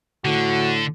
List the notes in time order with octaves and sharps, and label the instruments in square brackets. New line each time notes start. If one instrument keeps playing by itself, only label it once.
[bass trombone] A2 [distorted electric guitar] D3 [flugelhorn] F#4